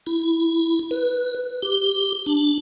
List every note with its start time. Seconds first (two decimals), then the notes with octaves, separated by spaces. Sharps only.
0.07 E4
0.91 B4
1.62 G4
2.26 D4